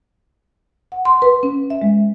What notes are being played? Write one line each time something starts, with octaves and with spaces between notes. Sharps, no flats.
F#5
C6
B4
C#4
E5
G#3